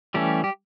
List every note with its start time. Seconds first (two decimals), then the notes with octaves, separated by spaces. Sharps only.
0.14 E3 G3 A3 C#4 G4
0.44 G4